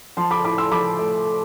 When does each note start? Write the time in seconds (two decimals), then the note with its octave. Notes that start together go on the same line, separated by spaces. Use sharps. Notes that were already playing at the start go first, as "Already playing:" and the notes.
0.17 F3 A5 C6
0.31 B5 D6
0.44 A2 B5 D6
0.58 C6 E6
0.71 F3 B5 D6
0.99 A3